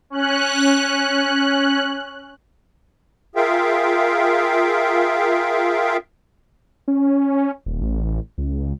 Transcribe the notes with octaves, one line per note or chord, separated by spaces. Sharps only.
C#4 F#6
F4 G#4 A#4 E5 F5 G5
C#4
D#1
A1
C#2